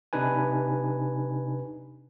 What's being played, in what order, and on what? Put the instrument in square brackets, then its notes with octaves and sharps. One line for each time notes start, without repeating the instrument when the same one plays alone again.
[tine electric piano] C3 D4 D#4 B4 G#5